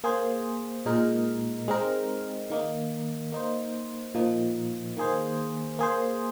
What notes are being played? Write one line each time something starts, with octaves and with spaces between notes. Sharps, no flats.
A#3 G#4 C5
A#2 G#3 D#4 A#4
G#3 C4 D#4 A#4
D#3 A#3 D#4
A#3 D#4 C5
A#2 F3 A#3 D#4
D#3 A#3 G#4 C5
A#3 G#4 C5